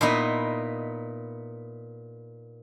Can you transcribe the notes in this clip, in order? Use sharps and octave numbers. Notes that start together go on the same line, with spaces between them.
A#2 B3 D#4 E4 D#5